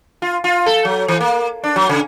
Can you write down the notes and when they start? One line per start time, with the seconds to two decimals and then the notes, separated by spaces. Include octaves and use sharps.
0.22 F4
0.44 F4
0.66 A4
0.85 F#3
1.08 E3
1.21 A#3
1.64 D4
1.76 F#3
1.89 C#3